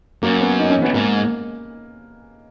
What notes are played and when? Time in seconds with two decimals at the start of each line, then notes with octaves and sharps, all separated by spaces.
0.23 F#2 A#3
0.41 B3
0.59 D#4
0.70 C#4
0.82 B3
0.94 G#2 A#3